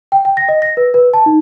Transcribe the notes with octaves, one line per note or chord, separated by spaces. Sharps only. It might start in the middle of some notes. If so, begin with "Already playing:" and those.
G5
G5
A#6
D#5
A#6
B4
B4
A5
D#4